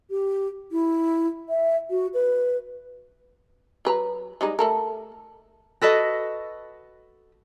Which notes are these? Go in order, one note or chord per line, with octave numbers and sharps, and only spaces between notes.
G4
E4
E5
F#4
B4
F#3 B4 A#5
G3 G#3 D#4
A3 A4 A#4
F#4 A4 B4 D#5